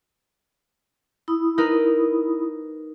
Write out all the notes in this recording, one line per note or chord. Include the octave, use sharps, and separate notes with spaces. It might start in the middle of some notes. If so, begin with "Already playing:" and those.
E4 B5 D#6
D#4 A#4 B4